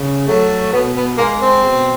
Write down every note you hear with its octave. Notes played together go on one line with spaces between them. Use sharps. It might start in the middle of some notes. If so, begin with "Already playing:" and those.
Already playing: C#3
F#3 A3
B2 B3
B3
G#3 A#3
C4
B2